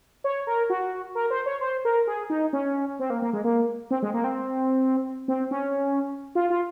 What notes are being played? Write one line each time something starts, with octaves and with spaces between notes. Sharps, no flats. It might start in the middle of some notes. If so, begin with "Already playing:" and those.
C#5
A#4
F#4
A#4
C5
C#5
C5
A#4
G#4
D#4
C#4
C4
A#3
A#3
G#3
A#3
C4
G#3
A#3
C4
C4
C#4
F4
F4